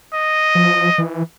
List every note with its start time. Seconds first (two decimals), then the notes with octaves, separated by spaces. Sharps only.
0.13 D#5
0.55 F3
0.98 E3